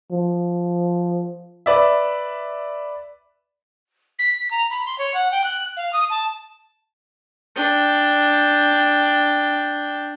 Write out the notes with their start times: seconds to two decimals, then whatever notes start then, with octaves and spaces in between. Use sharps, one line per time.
0.12 F3
1.66 B4 D5 E5
4.19 B6
4.50 A#5
4.70 B5
4.86 C6
4.98 C#5
5.14 F#5
5.31 G5
5.44 F#6
5.76 F5
5.93 D#6
6.10 A5
7.56 D4 G5